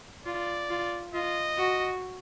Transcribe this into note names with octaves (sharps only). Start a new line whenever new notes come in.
F4 D5
F4
F4 D#5
F#4